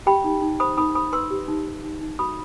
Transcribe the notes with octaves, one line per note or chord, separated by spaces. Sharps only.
G4 G5 B5
D#4
D#4
C5 B5 D#6
D#4 B5 D#6
C5 B5 D#6
B4 C6 E6
G4
D#4
D#4
D#4
D#4
F#4 B5 D#6